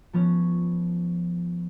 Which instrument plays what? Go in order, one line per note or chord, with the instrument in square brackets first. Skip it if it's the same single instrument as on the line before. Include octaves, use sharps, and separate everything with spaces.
[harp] F3 B3 C#4